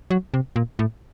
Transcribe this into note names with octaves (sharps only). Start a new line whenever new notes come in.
F#3
C3
A#2
A2